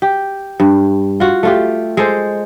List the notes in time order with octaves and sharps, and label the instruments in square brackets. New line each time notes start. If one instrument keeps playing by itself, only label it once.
[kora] G4
G2
F4 F#4
A3 F4 G4
G#3 A4 C5